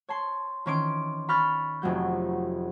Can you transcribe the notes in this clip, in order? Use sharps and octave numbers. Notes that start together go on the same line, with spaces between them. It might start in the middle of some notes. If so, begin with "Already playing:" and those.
C#5 A5 C6
D#3 E3 C#4 C6 D6 D7
B5 C#6 F6 G6 A6
F1 F2 F#3 G6